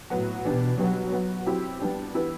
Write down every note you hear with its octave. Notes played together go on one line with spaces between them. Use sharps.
A2 F#3 B3 F#4
B2 E3 B3 D4 G4
B2 F#3 G3 B3
F#3 B3 F#4
F#3 C4 E4 G4
G3 B3 D4 G4
E3 B3 E4 G4